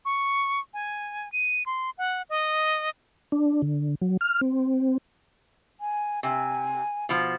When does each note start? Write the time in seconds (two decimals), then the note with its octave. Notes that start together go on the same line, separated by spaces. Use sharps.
0.05 C#6
0.74 G#5
1.32 D#7
1.66 C6
1.98 F#5
2.29 D#5
3.32 D4
3.62 D3
4.01 F#3
4.21 F6
4.41 C4
5.80 G#5
6.23 C3 G#5
7.09 B2 F3